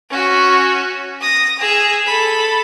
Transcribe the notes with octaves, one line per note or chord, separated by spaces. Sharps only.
C#4 F#4
D#6 A#6
G#4 E6
A4 B5